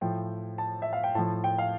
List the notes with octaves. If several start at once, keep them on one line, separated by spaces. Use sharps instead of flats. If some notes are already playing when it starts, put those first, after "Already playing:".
A2 F3 G5
A5
E5
F5
G5
A2 F3 A5
G5
F5